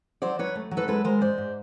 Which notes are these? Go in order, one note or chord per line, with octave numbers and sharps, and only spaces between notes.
F#3 C5 D5
F#3 B4 C#5
A3
F#3
A4 B4
G#3 A4 B4
G#3 A#4 C5
G#2 C5 D5
G#2